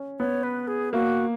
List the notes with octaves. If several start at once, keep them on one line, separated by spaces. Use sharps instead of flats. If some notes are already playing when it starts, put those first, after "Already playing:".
Already playing: C#4
B3 C#5
B4
G#4
A#3 F#4